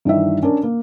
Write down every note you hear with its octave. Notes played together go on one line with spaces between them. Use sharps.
G2 D#3 E3 E5
C#4 D4 A#4
A#3